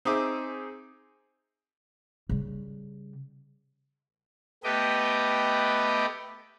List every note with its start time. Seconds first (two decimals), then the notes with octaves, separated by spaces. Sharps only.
0.05 C4 D#4 G#4 E5 D6
2.29 C#3 G3
4.64 A3 B3 G4 B4 D#5 G5